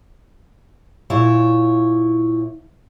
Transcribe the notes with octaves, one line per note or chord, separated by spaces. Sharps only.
A#2 E4 C#5